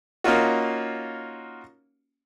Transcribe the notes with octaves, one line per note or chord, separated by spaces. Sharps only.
A#3 C#4 D#4 F4 F#4